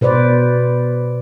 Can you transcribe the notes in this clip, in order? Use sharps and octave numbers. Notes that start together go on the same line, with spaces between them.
B2 B4 C5 D5